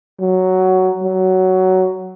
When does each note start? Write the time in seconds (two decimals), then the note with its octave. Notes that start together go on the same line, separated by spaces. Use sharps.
0.20 F#3
1.04 F#3